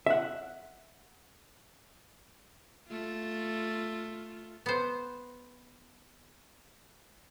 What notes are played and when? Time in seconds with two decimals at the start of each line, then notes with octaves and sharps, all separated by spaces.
0.06 E5 F#5
2.88 A3 F4
4.66 B3 C5